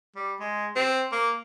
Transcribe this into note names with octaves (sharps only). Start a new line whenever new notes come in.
G3
G#3
C4
A#3